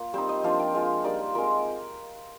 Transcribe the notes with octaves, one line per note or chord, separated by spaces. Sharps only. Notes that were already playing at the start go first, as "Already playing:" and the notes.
Already playing: A#3 F4
G3 C4 D#4 C5
D#5
F3 A#3 D4 F4 F5
G5
G#3 C4 F4 F5
G3 A#3 D#4 D5
C5
G#3 C4 F4 A#4